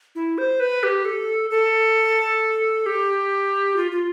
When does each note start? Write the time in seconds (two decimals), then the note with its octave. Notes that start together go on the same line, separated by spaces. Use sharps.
0.15 E4
0.38 C5
0.60 B4
0.83 G4
1.05 A4
1.50 A4
2.86 G4
3.76 F4
3.91 F4